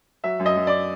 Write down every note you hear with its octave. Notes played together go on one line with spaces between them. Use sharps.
F#3 E5
F#2
D#5
F#2
D5